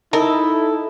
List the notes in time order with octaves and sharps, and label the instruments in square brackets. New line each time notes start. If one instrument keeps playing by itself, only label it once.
[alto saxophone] D#4 [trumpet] E4 [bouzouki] A4 [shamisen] A#4